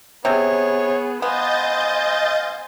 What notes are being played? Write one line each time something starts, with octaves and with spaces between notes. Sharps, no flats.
C3 B3 G#4 C#5
B3 C5 D#5 F5 G#5 G6 A6